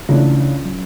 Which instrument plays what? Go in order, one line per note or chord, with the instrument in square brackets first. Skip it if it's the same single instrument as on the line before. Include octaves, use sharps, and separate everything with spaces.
[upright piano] C#2 C#3 E3 A3 D4 [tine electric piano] C#4
[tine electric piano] F#3